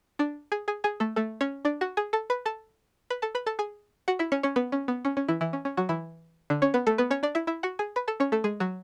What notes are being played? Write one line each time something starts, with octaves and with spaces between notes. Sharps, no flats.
D4 D5
G#4 G#5
G#4 G#5
G#4 G#5
A3 A4
A3 A4
C#4 C#5
D4 D5
F#4 F#5
G#4 G#5
A4 A5
B4 B5
A4 A5
B4 B5
A4 A5
B4 B5
A4 A5
G#4 G#5
F#4 F#5
E4 E5
C#4 C#5
C#4 C#5
B3 B4
C#4
B3
C#4
C#4
E3 E4
E3 E4
C#4
C#4
F#3 F#4
E3 E4
D3 D4
C#4 C#5
B3 B4
A3 A4
B3 B4
C#4 C#5
D4 D5
E4 E5
E4 E5
F#4 F#5
G#4 G#5
B4 B5
A4 A5
C#4 C#5
A3 A4
G#3 G#4
F#3 F#4